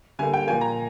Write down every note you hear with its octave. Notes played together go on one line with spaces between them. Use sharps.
D3 G3 A#3 G#5
G5
A#2 F3 A#3 G#5
A#5